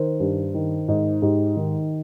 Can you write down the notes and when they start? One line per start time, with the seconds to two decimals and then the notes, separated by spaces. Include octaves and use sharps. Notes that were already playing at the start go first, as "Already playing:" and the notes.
Already playing: D#3 A#4 C5
0.20 G2
0.54 D#3
0.88 G#2
1.22 G#2 G4
1.56 D#3